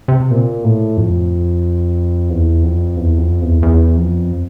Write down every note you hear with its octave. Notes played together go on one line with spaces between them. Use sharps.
C3
A#2
A2
F2
E2
F2
E2
F2
E2
E2
F2